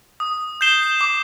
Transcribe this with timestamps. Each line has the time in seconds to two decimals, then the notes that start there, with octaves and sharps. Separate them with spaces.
0.20 D#6
0.61 G6 C7 E7 G7
1.01 D6